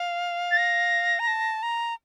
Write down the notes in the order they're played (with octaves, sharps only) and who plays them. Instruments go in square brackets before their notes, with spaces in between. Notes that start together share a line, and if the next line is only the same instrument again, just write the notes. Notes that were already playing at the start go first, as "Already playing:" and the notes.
Already playing: [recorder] F5
[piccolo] A6
A#6
[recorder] A#5
A5
A#5